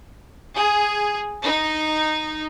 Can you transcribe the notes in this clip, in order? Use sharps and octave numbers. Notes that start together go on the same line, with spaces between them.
G#4
D#4